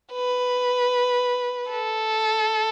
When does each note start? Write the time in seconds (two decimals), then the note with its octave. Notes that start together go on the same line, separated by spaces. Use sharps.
0.13 B4
1.70 A4